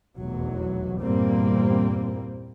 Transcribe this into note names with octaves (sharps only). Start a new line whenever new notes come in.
F1 B1 E2 F#3
E2 G2 A#2 G3 A#3 C4